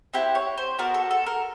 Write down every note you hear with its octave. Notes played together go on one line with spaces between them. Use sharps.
C4 E4 G4 F#5
C#5
C5
B3 D4 F#4 A#4
A4
A4
A#4